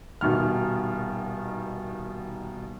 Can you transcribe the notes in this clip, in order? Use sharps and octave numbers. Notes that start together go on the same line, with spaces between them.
D#1 B2 D#3 F6